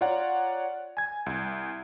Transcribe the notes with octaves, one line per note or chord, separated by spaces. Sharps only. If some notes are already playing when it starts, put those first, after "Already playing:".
F4 C#5 D5 F#5 A#5
G#5 G#6
C2